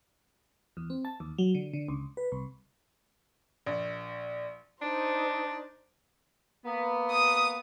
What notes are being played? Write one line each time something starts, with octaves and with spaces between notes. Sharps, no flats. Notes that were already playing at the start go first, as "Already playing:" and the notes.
E2
C4
A5
D#2
F#3
D3
D3
C#2
B4
C2
A#1
D4 D#4 C5
A#3 B3
D#6